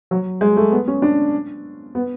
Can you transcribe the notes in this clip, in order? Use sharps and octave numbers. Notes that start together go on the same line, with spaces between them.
F#3
G#3
A3
B3
C#4
D4
B3